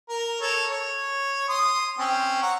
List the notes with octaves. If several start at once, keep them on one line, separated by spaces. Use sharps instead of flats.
A#4
A4 A#4 C#5
C#5
C6 D#6
C4 C#4
F#5 A#5 C#6